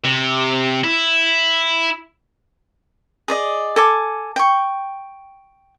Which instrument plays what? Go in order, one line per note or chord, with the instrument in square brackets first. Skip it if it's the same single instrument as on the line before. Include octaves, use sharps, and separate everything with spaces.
[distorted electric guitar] C3
E4
[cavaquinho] G#4 D5 D#5
A4 G#5 D6
G5 C#6